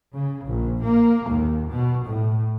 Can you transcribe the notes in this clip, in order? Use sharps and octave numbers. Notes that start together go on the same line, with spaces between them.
C#3
A#1
A#3
D#2
B2
A2